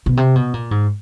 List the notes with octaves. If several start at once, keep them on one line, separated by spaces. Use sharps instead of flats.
B2
C3
B2
A#2
G#2